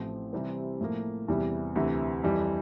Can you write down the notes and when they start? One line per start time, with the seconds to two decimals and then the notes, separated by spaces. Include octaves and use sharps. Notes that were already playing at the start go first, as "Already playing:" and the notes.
Already playing: A1 A2 F3 C4
0.33 C3 E3 G3 C4
0.81 A2 F3 A#3
1.28 E2 C3 E3 G3
1.75 D2 C3 E3
2.23 F2 E3 G3